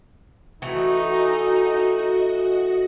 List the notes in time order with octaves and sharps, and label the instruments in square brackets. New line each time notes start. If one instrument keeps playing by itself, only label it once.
[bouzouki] E3 A3 [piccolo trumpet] D#4 [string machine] F#4 D#5